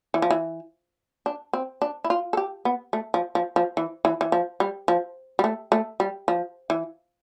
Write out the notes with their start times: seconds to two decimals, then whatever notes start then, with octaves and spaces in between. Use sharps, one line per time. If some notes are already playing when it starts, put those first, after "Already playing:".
0.14 E3
0.22 F3
0.31 E3
1.26 D4
1.53 C4
1.82 D4
2.04 E4
2.10 F4
2.33 A4
2.37 G4
2.65 B3
2.93 A3
3.14 F3
3.35 F3
3.56 F3
3.77 E3
4.05 E3
4.21 E3
4.32 F3
4.60 G3
4.88 F3
5.39 G3
5.44 A3
5.72 A3
6.00 G3
6.28 F3
6.70 E3